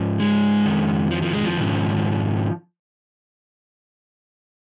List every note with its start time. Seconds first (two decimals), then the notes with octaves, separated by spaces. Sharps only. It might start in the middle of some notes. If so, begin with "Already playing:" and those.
Already playing: G#2 F3
0.20 G#3
0.65 F2 D#3
1.11 F3
1.22 F3
1.33 G#3
1.45 F3
1.57 G#2 D#3